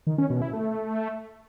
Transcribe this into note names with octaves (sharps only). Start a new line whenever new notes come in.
D#3
C#4
B2
E4
A3